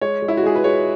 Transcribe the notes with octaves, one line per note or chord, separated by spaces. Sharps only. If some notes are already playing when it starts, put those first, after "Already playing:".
G#3 C#5
G#3
E4
F#4
G#3 G#4
B4
G#3 C#5